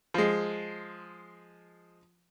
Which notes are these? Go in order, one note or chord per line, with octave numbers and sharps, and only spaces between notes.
F3 G#3